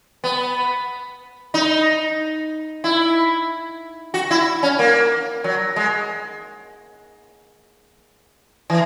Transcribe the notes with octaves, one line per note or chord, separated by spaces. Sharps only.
B3
D#4
E4
F#4
E4
C#4
A#3
F#3
G#3
E3